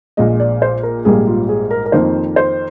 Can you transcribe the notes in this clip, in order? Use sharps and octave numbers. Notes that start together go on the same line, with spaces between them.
A#1 A#2 G#3 D#5
D5
C5
A#4
A#1 G#2 G3 A#3 G#4
F4
G#4
A#4
A#4
F2 D#3 A#3 C5
C5